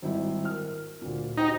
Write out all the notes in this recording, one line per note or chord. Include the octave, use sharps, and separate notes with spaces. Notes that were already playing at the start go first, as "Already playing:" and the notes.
G#1 G3 E4
A#4 F6
D2 A#2
D#4 F#4 C5 G5